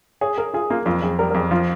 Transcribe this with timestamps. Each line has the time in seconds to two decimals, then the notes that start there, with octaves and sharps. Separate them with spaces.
0.21 G#4 C#5
0.38 G#4 A#4
0.54 F4 G#4
0.70 A#3 F4
0.86 F2 F4
1.02 F2 G#4
1.19 G3 A#4
1.30 A#4
1.34 F2 G#4
1.51 F3 F4